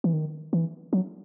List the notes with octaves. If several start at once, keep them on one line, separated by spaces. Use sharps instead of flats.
E3
D#3
E3
F#3